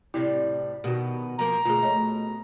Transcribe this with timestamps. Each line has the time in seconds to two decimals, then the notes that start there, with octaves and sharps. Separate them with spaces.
0.14 A2 C3 G3 E4
0.84 B2 D#3 B3 F#4 G4
1.39 F3 A#3 A#4 A#5
1.65 D2 B2 F4 G#4
1.83 A3 C#5 D#5